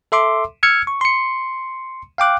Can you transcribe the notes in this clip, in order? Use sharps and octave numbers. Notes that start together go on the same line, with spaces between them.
A4 E5 C6 D6
E6 F6 G#6 C#7
C#6
C6 C#7
F5 G5 D6 F#6